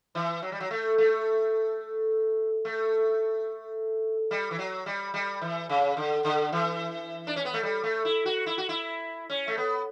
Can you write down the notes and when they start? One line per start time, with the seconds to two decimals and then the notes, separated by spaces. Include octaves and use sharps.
0.15 E3
0.42 F#3
0.52 G3
0.60 F#3
0.71 A3
0.98 A3
2.65 A3
4.31 G3
4.51 E3
4.59 F#3
4.86 G3
5.14 G3
5.41 E3
5.69 C#3
5.97 D3
6.24 D3
6.52 E3
7.27 D4
7.36 C#4
7.45 B3
7.54 A3
7.63 G3
7.83 A3
8.05 E4
8.26 F#4
8.46 E4
8.58 F#4
8.69 E4
9.30 C#4
9.48 A3
9.57 B3